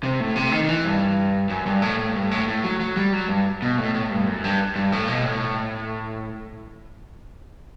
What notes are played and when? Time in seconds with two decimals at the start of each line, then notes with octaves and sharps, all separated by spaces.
0.03 C3
0.20 A2
0.36 C3
0.52 D#3
0.64 D#3
0.69 E3
0.85 G2
1.50 F#2
1.66 G2
1.82 A2
1.99 A2
2.15 G2
2.31 A2
2.48 A2
2.64 F#3
2.80 F#3
2.97 G3
3.13 F#3
3.29 G2
3.62 B2
3.78 A2
3.94 A2
4.11 G2
4.27 F#2
4.44 G2
4.76 G2
4.92 A2
5.08 B2
5.25 A2